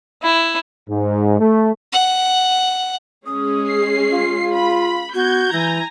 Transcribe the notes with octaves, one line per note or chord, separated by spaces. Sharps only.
E4
G#2
A3
F#5
G#3 C#4 G#4 D#6
C7
F4 F5
B5
B3 F#4 G6 G#6
E3 E4 G#5 A#5